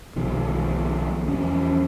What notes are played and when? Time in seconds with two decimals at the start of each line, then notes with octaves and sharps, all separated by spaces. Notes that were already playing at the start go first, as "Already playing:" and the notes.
0.16 B1 B2 D#3 F3
1.28 E2 F3 C#4